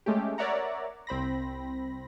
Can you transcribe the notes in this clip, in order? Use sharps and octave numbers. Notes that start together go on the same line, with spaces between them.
G#3 A3 C#4 G4
A#4 C#5 D5 E5 F#5 A#5
C2 C4 B5 A#6